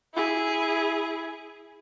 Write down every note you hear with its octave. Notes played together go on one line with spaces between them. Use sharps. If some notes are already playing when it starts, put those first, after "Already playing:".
E4 G#4